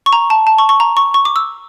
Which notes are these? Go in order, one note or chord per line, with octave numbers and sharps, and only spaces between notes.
C#6
A#5
A5
A5
C#6
C#6
A#5
C#6
C#6
D6
E6